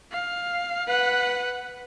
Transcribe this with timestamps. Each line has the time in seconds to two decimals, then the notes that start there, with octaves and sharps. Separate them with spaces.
0.12 F5
0.88 B4 F#5